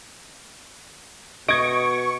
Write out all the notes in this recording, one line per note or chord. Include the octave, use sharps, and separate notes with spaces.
B2 D#5 C#6 G#6 D7